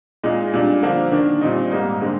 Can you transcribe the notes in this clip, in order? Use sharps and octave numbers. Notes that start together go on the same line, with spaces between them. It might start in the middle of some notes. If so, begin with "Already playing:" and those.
A#2 G#3 D#4
A#2 G3 D4
D3 F3 A#3 D4
D#3 A#3 D4
A#2 G3 C4 D#4
G#2 G3 A#3 D#4
D3 G#3 C4